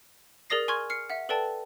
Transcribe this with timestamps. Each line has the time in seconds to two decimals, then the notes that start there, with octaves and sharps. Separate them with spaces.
0.50 G#4 A#4 D5 D#6 A#6 C7
0.68 G#5 C6 C#6 F6 G#6
0.90 F6 C7 C#7
1.10 E5 F#5
1.29 A4 B4 D5 G5 A5